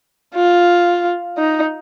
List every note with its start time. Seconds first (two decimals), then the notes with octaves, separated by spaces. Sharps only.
0.35 F4
1.38 D#4